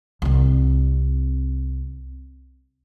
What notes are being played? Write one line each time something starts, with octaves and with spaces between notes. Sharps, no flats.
C2 C4